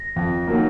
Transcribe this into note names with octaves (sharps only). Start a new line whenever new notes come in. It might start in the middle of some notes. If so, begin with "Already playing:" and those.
Already playing: A#6
F2
D#3 F#3 A#3